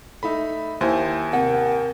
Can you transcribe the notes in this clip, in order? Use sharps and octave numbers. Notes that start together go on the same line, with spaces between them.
A3 D#4 E5 B5
D#2 E4 C5 G#5
C3 A#4 F#5